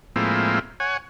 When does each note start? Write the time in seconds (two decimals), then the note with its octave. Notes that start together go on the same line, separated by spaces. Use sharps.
0.16 A2 F3 G#3 A#3 C4 E4
0.80 C#5 F#5 G#5